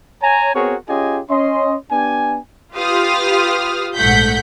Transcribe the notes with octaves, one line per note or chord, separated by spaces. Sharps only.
C#5 G#5 A#5
B3 C4 F#4 G#4 A#4 C#5
C#4 F4 G4 G#4 D#5 G#5
C#4 D#5 C6
B3 D4 G4 G#5
F4 G4 B4 F5 D#6 F6
A#1 G#2 A3 F#5 G6 B6